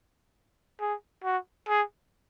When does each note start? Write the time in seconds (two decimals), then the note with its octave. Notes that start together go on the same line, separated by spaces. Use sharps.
0.80 G#4
1.24 F#4
1.68 G#4